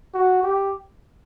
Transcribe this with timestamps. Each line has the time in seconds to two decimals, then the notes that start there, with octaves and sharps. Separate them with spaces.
0.14 F#4
0.43 G4